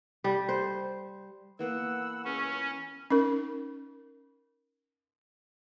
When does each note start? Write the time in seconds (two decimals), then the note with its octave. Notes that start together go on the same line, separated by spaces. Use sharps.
0.24 G3
0.49 C5
1.59 E3 A#3 B3 F#5 E6
2.25 C#2 C#4 C#6
3.10 C#4 D#4 A#4